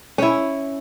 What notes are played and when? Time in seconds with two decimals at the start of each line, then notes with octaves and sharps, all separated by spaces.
0.18 C#4 E4